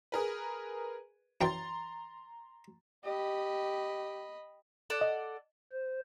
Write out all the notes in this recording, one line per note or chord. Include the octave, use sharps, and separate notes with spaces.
G#4 A#4 B4
F#2 E3 G5 A#5 C6 A6
G4 D#5 B5
A4 D5 F#5
D#5
C5